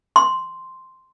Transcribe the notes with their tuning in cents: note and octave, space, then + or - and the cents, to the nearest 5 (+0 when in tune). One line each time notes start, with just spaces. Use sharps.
C6 -5